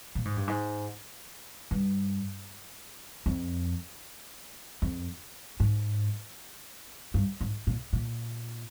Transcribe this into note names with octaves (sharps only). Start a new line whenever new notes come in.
A#2
G#2
G2
G#2
G2
F2
F2
G#2
G2
G#2
A#2
A#2